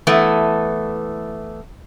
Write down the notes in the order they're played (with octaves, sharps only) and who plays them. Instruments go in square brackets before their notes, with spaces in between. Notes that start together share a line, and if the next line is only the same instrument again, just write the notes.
[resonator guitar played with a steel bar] E3 A3 B3